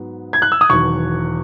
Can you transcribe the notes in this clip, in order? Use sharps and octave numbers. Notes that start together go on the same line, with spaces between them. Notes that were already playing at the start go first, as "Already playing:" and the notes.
Already playing: G#2 F#3 B3
G#6
F#6
E6
D#6
E1 E2 D#3 F#3 C#6